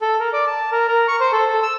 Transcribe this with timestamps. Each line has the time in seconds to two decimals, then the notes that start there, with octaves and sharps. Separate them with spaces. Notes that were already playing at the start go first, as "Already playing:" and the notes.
0.01 A4
0.20 A#4
0.33 D5
0.47 A5
0.72 A#4
0.88 A#4
1.08 C#6
1.20 C5
1.33 A4
1.48 A4
1.63 E6